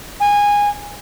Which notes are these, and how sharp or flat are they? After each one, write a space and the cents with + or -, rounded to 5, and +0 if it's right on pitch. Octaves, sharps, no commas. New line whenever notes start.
G#5 -20